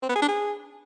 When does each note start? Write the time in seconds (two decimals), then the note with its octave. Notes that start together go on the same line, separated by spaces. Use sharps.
0.03 C4
0.09 B3
0.16 G#4
0.22 D4
0.28 G#4